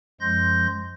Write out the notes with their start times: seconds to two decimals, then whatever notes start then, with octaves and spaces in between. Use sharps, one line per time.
0.21 F#2 F3 G#3 C6 G6 A#6